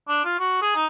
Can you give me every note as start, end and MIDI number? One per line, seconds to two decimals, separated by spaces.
0.08 0.24 62
0.25 0.36 65
0.39 0.60 66
0.62 0.75 68
0.75 0.86 63